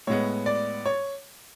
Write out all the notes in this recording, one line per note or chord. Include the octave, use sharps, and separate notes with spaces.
A2 G#3 B3 C#5
D5
C#5